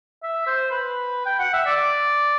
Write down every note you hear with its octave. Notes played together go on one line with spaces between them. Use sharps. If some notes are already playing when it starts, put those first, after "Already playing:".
E5
C5
B4
G5
F#5
E5
D5